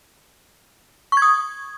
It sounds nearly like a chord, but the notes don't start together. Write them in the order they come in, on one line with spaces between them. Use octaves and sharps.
C#6 G#6 D#6